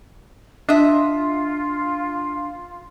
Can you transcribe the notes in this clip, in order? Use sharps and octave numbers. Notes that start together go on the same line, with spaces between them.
D4 F4 D#5 E5